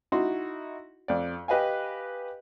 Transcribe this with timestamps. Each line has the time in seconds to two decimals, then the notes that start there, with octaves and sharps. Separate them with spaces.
0.12 D#4 E4 F#4 C6
1.08 F2 D5
1.48 G4 B4 D#5 F5 G#5